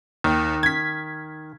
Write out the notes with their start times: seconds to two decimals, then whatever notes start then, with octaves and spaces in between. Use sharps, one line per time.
0.24 D#2 D#3
0.63 G#6 B6